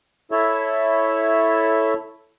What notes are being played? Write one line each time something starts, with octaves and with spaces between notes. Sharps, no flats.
E4 A4 C#5 E5